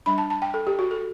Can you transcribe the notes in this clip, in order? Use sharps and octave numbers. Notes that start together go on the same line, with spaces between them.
G3 D4 B5
A5
A5
G5
A4
G4
F#4
A4